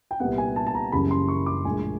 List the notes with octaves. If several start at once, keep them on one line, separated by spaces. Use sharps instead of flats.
G5
C2 A#2 G3 B3 F#5
G#5
A5
A5
A#5
F#1 F#2 C#3 E3 G3 B5
C6
C#6
D6
A#1 A2 E3 G#3 G#5